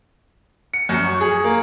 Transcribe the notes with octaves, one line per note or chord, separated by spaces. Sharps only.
C#7
F#2
C#6
G#4
A#3